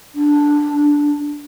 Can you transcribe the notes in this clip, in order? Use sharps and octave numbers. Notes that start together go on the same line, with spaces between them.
D4